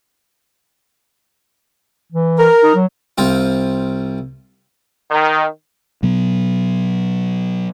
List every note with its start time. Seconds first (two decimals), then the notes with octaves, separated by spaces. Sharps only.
2.12 E3
2.40 A#4
2.63 D#4
2.75 F#3
3.18 C2 C4 F4
5.11 D#3
6.03 B2 F#3 B3